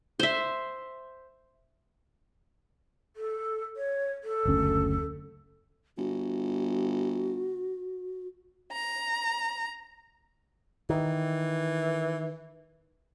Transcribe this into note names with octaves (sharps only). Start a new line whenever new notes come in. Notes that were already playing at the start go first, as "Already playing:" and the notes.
C5 E5
A4
C#5
A4
F#1 D2 C#4
G1 F#4
A#5
D#3 E3